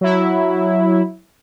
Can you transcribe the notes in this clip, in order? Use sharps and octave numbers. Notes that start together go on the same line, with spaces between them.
F#3 E4